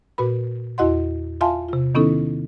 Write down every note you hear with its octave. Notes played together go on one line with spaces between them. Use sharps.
A#2 F#4 B4 B5
E2 E4 F#4 D#5 F#5 C6
F4 E5 F5 G#5 A5 C6
C3 F4
D#3 B3 C#4 D#4 E4 A4